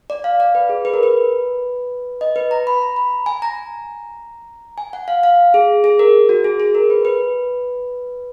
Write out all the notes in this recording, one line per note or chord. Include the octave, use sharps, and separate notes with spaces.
D5
F5
D5
B4
G#4
B4
A#4
B4
D#5
B4
A#5
B5
A#5
B5
G#5
A#5
G#5
F#5
F5
F5
G#4
G#4
A#4
F#4
G#4
G#4
A#4
B4
B4